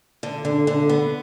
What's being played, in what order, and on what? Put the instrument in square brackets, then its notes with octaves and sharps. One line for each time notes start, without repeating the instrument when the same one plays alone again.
[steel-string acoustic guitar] D3
D3
D3
B3